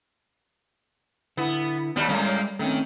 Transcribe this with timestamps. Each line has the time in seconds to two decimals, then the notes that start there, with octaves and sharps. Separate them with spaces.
1.37 D3 B3 E4
1.96 D#2 G3 B3 D#4 F#4
2.09 A2 G3 G#3 A#3 C#4
2.59 D#3 A3 C4 C#4